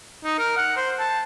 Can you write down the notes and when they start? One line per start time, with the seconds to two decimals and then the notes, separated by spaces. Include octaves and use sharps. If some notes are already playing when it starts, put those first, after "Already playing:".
0.25 D#4
0.39 A#4
0.57 F#5
0.77 C5
0.99 A5